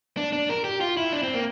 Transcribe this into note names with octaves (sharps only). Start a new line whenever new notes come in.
D4
D4
A#4
G4
F4
E4
D4
C4
A#3